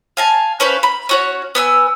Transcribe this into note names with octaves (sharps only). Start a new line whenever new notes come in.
F5 G#5 A5
C#4 B4 C5 F5
B5
C#4 F#4 C#5
B3 G#5 E6